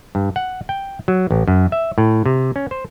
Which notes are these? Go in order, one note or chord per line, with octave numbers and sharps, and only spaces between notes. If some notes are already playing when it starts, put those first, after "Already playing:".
G2
F#5
G5
F#3
A1
F#2
E5
A2
C3
C#4
C5